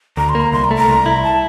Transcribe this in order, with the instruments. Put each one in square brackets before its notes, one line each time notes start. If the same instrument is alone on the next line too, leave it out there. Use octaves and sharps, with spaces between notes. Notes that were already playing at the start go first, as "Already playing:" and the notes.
[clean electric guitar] D2 [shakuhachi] A#5
[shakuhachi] C6
[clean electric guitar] A#3
[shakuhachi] A#5
[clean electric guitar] C2 [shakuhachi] C6
[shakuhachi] A#5
[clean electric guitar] A3
[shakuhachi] A#5
[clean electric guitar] C2
E4
[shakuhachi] A5